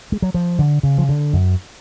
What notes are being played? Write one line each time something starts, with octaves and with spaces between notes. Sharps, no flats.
G#3
F#3
F3
D3
C#3
F3
D3
F#2